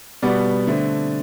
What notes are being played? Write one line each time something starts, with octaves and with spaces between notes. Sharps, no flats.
B2 G3 B3 D5
D3 A3 C4